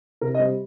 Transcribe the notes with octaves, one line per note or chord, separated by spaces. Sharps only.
C3 A#4
D#5
G3 C5